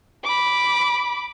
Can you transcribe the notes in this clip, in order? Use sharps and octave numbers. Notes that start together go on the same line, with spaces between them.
B5 D6